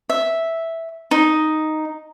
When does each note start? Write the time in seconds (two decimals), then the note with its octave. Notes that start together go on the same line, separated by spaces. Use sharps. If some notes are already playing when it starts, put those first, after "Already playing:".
0.10 E5
1.11 D#4